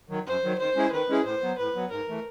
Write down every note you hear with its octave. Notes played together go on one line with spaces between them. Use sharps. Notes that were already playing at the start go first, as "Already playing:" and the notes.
D#3 F#3
F#2 C5
D#3 F#3
D#3 C5
G#3 C#4 E4 G#4
D#3 B4
G#3 C#4 E4 G#4
A2 C5
F#3 B3
A2 B4
F#3 B3
G#2 A#4
E3 A3